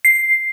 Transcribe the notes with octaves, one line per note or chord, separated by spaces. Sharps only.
C7